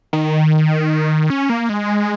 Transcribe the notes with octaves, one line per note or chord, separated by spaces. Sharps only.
D#3
C#4
A#3
G#3